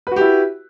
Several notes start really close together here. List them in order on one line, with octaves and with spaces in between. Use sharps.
B4 F#4 G4 E4